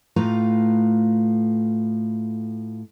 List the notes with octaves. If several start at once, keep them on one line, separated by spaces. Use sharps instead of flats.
A2 A3 F4 B4 F5 A#5